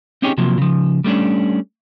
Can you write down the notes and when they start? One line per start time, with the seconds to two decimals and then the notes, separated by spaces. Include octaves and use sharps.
0.22 C4 C#4 D#4 G4 G#4 C#5
0.38 C3 F3 F#3 A#3
0.58 C#3 F3
1.04 G3 A3 C#4 D4